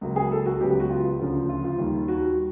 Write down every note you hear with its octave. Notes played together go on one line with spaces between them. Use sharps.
C#2 C#3 F#3 A#3
G#4
A4
F#4
C#2 C#3 F#3 B3 G4
G4
F#4
F4
D2 C#3 F3
F4
F4
D#2 D#3 G3
F#4